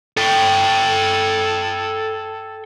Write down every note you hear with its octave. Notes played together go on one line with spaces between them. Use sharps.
A4 G5